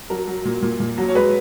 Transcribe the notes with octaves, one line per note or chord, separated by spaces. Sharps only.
F#3 A#4
F#3
A#2
A#2
A#2
F#3
C#5
G#3 B4